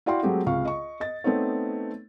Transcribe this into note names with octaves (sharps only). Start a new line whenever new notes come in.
E4 F#4 D5 F5 G5 C6
F#3 G#3 A3 C4 F#4 G4
C#2 C3 F5 C#6
D#5 C#6
D#5 A6
A3 B3 C4 D#4 C#5